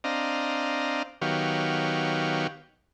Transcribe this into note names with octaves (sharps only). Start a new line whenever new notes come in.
C4 D4 D#5 F5 A#5
D#3 F#3 B3 G4 C#5 F5